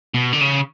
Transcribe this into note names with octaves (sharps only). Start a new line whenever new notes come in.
B2
D3
C#3